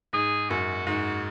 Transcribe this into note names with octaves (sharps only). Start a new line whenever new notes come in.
G#2 G#4
F#2 F#4
G#2 F#4